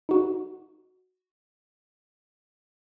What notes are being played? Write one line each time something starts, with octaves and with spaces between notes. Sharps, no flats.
D#4 F#4